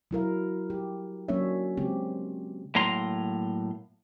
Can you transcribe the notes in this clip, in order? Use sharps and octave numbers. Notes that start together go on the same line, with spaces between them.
F#3 E4 A#4 F5
G4
F#3 A#3 C#4 D4 C#5 E5
C#3 G#3 C4 G4
A2 F#3 A#3 A#5 C6